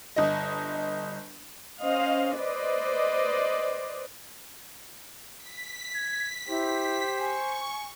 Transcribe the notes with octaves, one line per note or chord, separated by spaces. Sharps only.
G1 D#5
C#4 C5 D#5 F5
B4 C5 D5 D#5
B6
G#6
E4 G4 C5
G#5 C#6